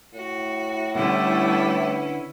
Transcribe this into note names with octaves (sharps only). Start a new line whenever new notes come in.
A2 F#4
D3 G3 A3 B3 C#4 E4